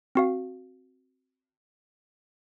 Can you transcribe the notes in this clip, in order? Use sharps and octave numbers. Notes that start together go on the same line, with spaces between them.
C4 F#4 F5